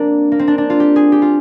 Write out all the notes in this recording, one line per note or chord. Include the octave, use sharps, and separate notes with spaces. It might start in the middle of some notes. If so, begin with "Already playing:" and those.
Already playing: A#3 C4 D4
A#3
C4
D4
D4
F4
G4
G#4
G4
F4